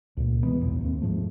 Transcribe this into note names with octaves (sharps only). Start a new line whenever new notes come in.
C#2 A#2
B2 E3 G#3 B3
B1 E2 G#2
D#2 C4
G#2 F3 A3